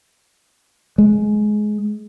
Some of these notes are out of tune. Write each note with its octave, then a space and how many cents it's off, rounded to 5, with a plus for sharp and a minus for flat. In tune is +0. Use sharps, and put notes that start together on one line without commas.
G#3 +20